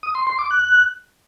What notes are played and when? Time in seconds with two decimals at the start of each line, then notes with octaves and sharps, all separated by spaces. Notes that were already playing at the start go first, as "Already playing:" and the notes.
0.03 D#6
0.15 C6
0.27 C6
0.39 D6
0.51 F#6